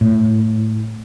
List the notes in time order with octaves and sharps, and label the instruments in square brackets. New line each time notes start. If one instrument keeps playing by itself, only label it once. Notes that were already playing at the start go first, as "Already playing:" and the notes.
[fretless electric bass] A2